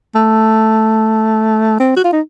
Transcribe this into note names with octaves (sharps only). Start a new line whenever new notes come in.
A3
C4
F#4
F4
D#4